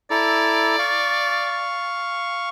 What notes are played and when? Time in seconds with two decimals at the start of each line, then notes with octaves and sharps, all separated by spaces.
0.11 E4 A4 D5 A#5
0.79 F5 C#6